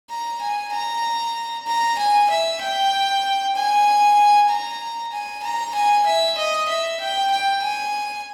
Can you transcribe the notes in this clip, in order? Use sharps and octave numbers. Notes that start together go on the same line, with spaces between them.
A#5
G#5
A#5
A#5
G#5
E5
G5
G#5
A#5
G#5
A#5
G#5
E5
D#5
E5
G5
G5
G#5